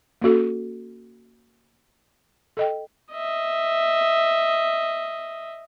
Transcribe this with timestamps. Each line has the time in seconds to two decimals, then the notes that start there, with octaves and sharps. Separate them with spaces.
0.22 A#3 C#4 F#4 A4
2.57 A4 D#5 G5
3.12 D#5 E5